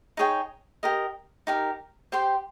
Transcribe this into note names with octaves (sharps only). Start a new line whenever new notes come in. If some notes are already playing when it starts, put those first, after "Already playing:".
D#4 G#4 C#5 G5
G4 A#4 D#5
D#4 G4 A#4
G4 C5 G5 C6